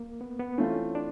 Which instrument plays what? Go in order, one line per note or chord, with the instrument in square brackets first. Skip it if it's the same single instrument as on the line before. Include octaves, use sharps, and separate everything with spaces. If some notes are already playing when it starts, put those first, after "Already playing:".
Already playing: [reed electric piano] A#3
B3
B3
[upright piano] E3 A3 C4 F4 [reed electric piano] C#4
[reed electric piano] D4